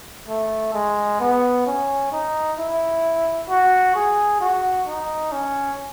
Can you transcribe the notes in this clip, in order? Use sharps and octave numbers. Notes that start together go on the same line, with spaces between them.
A3
G#3
B3
C#4
D#4
E4
F#4
G#4
F#4
D#4
C#4